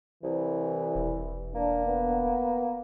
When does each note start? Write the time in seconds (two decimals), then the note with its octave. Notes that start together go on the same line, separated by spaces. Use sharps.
0.23 C2 E3
0.95 E1
1.55 A#3 D4
1.86 B3